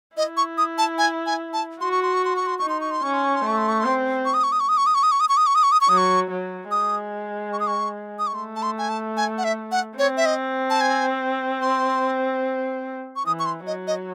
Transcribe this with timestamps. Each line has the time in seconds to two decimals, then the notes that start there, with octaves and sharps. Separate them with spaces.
0.17 E4 D#5
0.37 C#6
0.58 D#6
0.78 A5
0.98 G#5
1.26 G#5
1.53 A5
1.80 F#4 C6
1.92 C#6
2.03 C6
2.14 C#6
2.25 C6
2.36 C#6
2.47 C6
2.59 D#4 C#6
2.69 C6
2.81 C#6
2.91 C6
3.03 C#4 C#6
3.13 C6
3.25 C#6
3.35 C6
3.44 A3 C#6
3.58 C6
3.69 C#6
3.80 C4 C6
4.25 C#6
4.34 D#6
4.44 C#6
4.52 D#6
4.60 C#6
4.69 D#6
4.77 C#6
4.86 D#6
4.95 C#6
5.03 D#6
5.12 C#6
5.20 D#6
5.29 C#6
5.37 D#6
5.47 C#6
5.55 D#6
5.63 C#6
5.72 D#6
5.81 C#6
5.89 F#3 D#6
5.98 C#6
6.30 F#3
6.71 G#3 D#6
7.53 C#6
7.60 D#6
7.67 C#6
8.19 D#6
8.27 C#6
8.35 A3 C6
8.56 A5
8.63 C6
8.78 G#5
8.89 A5
9.17 G#5
9.38 F#5
9.44 E5
9.72 F#5
9.98 C4 C#5
10.17 E5
10.26 D#5
10.70 A5
10.81 G#5
11.62 C6
13.16 C#6
13.26 E3 D#6
13.39 C#6
13.46 C6
13.67 F#3 D#5
13.87 D#5